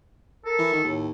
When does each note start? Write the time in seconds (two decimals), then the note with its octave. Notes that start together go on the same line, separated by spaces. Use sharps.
0.45 A4 A#4
0.58 E3
0.73 D#3
0.84 D#2 A2